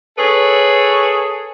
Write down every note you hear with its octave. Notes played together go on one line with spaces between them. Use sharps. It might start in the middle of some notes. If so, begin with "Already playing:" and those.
G#4 A4 B4 C#5